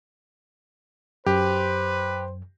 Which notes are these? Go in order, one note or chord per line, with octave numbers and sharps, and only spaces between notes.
F#2 G4 B4 C5